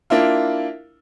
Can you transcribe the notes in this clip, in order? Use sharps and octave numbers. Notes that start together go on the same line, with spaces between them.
A#3 D4 E4 F4